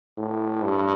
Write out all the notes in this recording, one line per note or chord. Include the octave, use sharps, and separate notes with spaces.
A2
G2